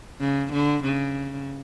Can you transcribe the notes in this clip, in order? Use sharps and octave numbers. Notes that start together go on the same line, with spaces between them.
C#3
D3
C#3